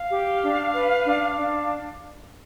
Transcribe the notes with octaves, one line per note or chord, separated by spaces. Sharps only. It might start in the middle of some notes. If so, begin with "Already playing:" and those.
Already playing: F5
G4
D4
B4
D4
D4